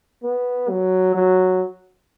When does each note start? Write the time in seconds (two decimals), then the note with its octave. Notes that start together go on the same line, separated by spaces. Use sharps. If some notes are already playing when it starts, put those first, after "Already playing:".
0.23 B3
0.69 F#3
1.15 F#3